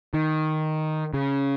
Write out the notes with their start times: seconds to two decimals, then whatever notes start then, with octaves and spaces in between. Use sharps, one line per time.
0.14 D#3
1.14 C#3